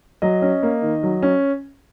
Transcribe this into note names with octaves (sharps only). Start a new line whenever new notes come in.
F#3 D#5
C#4
A#3
D#3
F#3
C#4